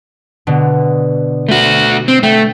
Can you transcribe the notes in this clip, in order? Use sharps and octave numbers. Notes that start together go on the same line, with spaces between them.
B2 D3
A3 F#4
C4
A3 G5